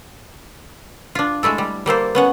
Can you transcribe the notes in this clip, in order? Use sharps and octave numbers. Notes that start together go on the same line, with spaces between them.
D4 F4
G#3 A3 E4 A4
G3
G3 A#3 A4 C5
B3 C#4 F#5